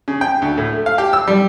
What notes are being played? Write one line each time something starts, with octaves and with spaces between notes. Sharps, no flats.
C#3
G5
D2
A2
A3
F5
G4
E6
G3